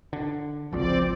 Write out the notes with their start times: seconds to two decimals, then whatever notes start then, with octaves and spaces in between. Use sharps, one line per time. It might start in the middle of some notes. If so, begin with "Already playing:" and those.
0.13 D3
0.73 G#1 C#2 F3 C4 D5